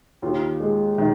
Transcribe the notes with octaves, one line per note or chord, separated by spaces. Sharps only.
D#2 F4
G#3
D#3